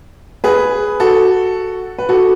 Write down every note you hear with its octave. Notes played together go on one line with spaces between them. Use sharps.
G#4 B4
F#4 A4
B4
F#4 A4